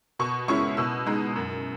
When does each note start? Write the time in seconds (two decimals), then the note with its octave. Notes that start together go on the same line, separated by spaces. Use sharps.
0.19 B2 C#6
0.48 G#3 C#4 E4 C#6
0.77 B2 E6
1.06 G#3 D#4
1.36 F#2